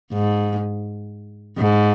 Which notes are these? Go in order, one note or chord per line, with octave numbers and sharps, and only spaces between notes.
G#2
G#2